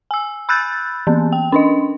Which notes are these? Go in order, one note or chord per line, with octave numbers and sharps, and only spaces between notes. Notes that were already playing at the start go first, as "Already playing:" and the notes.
G#5 E6
B5 E6 F#6 G6 A6
E3 A#3 B3
G5
C#4 D4 D#5